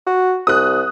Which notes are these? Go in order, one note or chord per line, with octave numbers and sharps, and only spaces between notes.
F#4
C2 D#6 F#6